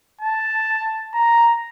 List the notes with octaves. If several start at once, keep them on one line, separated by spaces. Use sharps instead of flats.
A5
A#5